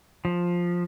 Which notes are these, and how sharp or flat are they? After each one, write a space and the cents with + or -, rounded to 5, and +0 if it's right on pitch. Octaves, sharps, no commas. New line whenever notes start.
F3 +5